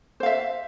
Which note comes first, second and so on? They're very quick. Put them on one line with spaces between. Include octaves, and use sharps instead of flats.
C5 F5 E5